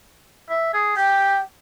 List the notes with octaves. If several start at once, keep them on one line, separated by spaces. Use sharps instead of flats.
E5
G#4
G4 G5